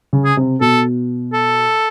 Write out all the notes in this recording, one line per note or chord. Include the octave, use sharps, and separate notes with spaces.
C#3
G#4
C3
B2 A4
A4